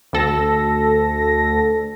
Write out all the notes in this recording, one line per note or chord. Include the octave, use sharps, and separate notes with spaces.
D2 A4 A#6